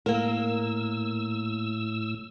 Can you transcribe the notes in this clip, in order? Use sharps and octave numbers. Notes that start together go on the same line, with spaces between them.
A2 A#3 A#4 E6